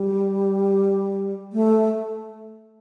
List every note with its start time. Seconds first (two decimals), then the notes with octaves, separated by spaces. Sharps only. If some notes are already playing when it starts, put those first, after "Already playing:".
Already playing: G3
1.53 A3